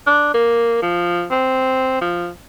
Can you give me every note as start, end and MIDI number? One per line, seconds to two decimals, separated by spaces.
0.07 0.31 62
0.34 0.80 58
0.82 1.25 53
1.31 2.01 60
2.01 2.29 53